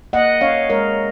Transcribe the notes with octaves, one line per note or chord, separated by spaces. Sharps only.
A#3 D#5 F#5
C#4 C#5 F5
G#3 A#4 C#5